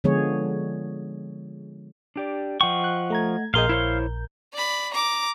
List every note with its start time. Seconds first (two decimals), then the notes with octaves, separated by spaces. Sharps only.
0.04 D3 F3 G#3 B3 G#4 C#5
2.16 D4 G4 D5
2.61 F3 D#5 F#5 G5 C#6
2.84 F#6
3.10 A3 A#5 G#6
3.54 A#1 A#2 G#4 A#4 D#5 F5 C6 G6
3.69 E4 C5 C#5
4.53 D5 B5
4.93 A#5 D6